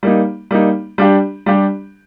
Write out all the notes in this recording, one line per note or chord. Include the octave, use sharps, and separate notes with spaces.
G3 A#3 D#4
G3 A#3 D#4
G3 D4 G4
G3 D4 G4